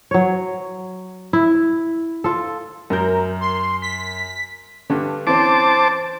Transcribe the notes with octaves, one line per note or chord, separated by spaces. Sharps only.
F#3 C#5
E4
F4 A4
F#2 A#4 G6
C6
B6
G2 D3
E3 C4 C#4 C5 A5 D6